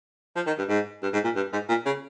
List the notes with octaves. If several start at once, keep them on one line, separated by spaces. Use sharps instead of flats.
F3
D#3
G2
G#2
G2
G#2
A#2
G2
G#2
A#2
C#3